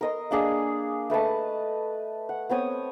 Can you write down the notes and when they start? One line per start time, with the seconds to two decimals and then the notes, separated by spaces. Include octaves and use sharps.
0.01 A#4 D#5 C6
0.31 A#3 D4 G#4
1.10 A3 B4 D#5 A5
2.29 F#5
2.49 B3 C4 C#5 D#6